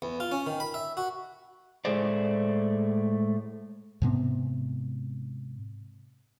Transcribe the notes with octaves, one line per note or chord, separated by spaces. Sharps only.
E2
F4
C#4
D#3
B5
E5
F#4
A2 G#3 A3 G#4 C5 D5
G#2 C3 B3 C4